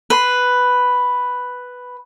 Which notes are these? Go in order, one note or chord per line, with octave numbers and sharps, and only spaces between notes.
B4 C6